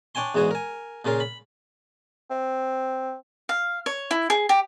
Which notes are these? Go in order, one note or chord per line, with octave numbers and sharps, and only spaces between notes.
D4 C#5 G5 G#5 C6
E2 G#2 G#3 F#4 G#5
A#4 G#5
A#2 C#3 F4 A#4
B5
C4
F5
C#5
E4
G#4
G4